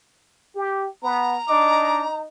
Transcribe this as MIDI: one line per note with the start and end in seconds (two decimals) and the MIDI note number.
0.55 0.85 67
1.03 1.37 59
1.03 2.18 82
1.49 2.04 62
1.49 2.26 63
1.49 2.04 75
1.49 2.04 86